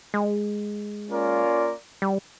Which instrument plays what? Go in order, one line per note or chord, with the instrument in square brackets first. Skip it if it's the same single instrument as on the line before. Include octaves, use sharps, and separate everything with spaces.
[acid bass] G#3
[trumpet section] A#3 C#4 F4 A#4 D5
[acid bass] G3